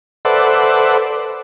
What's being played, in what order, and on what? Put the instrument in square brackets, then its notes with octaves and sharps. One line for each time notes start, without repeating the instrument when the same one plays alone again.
[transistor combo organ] A4 B4 C5 D5 E5 F#5